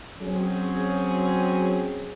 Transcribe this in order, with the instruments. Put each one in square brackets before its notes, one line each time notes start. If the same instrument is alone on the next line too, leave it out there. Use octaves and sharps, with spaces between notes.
[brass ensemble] F#3 C4 C#4 G#4